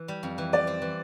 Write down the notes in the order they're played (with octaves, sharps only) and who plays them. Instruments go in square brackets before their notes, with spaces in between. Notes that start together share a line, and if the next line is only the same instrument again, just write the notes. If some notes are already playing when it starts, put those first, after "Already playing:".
Already playing: [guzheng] E3
G3
F2
E3
[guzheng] G4 [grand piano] D5
[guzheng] C4
E3